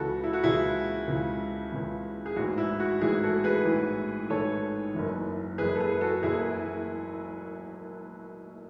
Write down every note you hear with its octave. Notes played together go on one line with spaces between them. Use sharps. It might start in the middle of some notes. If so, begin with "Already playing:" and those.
Already playing: C#2 C#3 E3 F#4 A4
E4
F#4
C#2 C#3 E3 E4 G#4
C#2 C#3 E3
C#2 C#3 E3
G#4
A1 G#2 E3 F#4
E4
F#4
A1 G#2 E3 E4 G#4
F#4 A4
G#4 B4
A1 G#2 E3
A1 G#2 E3 A4 C#5
F#1 F#2 E3
F#1 F#2 E3 G#4 B4
A4
G#4 B4
F#4 A4
F#1 F#2 E3 E4 G#4